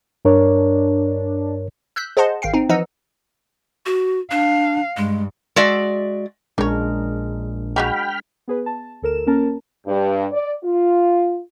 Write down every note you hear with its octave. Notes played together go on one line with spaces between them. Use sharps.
G2 D4 A#4 C#5
E6 F#6 G6 B6
G#4 C5 D#5 F#5 A5 C6
G#1 F5 G5 C7
C4 D#4
E3 F3 D#4 D#5 F#5 E6
F#4
D4 F5
G2 G#3
G#3 F#4 D5 E5
A#1 C#3 G#3 D4 A#4 C#5
F#3 G#3 F#4 G5 B5 F6
B3 G#4 B4
A5
D2 A4 A#4 E7
A#3 C#4 A#4 A5
G2
D5
F4